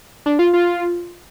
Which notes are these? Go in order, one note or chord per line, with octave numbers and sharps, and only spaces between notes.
D4
F4
F4